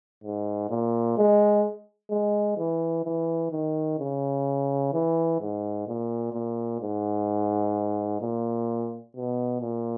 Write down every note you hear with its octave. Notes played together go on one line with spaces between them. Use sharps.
G#2
A#2
G#3
G#3
E3
E3
D#3
C#3
E3
G#2
A#2
A#2
G#2
A#2
B2
A#2